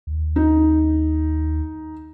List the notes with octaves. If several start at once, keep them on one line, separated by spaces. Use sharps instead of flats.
D#2
D#4